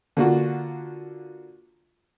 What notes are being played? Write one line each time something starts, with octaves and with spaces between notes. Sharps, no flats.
D3 A#3 F4 F#4